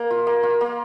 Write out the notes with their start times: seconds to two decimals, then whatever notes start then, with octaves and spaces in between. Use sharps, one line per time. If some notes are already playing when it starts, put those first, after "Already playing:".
Already playing: A#3
0.11 F4
0.27 A#3
0.43 F4
0.61 A#3